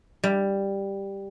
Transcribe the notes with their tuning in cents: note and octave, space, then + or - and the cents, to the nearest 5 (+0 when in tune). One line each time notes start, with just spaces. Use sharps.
G3 +5